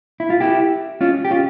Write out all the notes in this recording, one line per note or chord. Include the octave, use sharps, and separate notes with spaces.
E4
F4
E4 G4
C#4 F4
G4
C#4 F4